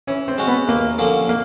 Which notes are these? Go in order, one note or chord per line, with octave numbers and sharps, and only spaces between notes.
E3 C#4
C4
G#3 C#4 F#4
B3
D#2 A#3
D3 F3 A#3 C#4
A#3